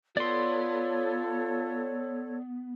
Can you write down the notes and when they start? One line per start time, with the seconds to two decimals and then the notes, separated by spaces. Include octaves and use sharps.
0.17 B3 F4 A4 C#5 D5 C6